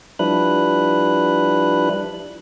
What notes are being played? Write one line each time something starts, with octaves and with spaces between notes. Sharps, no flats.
F3 G3 D4 E4 B4 F#6